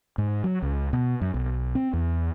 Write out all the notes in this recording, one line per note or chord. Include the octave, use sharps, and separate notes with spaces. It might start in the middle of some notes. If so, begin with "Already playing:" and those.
G#2
F#3
C#2
B2
F#2
B1
C4
E2